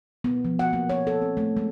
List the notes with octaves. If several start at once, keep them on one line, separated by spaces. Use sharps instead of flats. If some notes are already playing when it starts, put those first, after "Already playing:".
B3
F3
F#5
A#3
C#5
A4
C4
A3
G#3